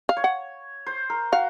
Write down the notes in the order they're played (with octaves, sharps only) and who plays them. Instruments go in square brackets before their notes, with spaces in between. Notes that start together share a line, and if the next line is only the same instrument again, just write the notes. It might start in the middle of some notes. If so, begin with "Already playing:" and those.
[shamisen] F5
[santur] C#5
[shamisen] F#5
[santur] C5
A#4
[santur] F#4 [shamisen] F5